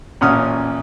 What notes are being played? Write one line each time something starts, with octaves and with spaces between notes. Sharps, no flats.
A1 A#2 C#4 F#5 D#6 F6